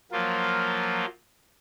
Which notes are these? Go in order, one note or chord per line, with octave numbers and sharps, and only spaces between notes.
F3 F#3 A#3 F4